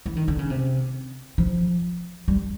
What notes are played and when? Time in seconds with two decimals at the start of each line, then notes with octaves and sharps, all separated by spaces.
0.06 E3
0.16 D#3
0.28 D3
0.39 C#3
0.50 C3
1.38 F3
2.28 G3